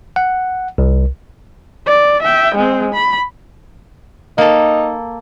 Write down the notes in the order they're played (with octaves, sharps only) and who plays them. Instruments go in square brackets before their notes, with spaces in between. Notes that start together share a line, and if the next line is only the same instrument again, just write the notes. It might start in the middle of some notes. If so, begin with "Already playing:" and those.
[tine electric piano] F#5
C2
[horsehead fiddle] D5
E5 G5
G#3 C4
B5
[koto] A#3 A4 [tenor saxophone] D#4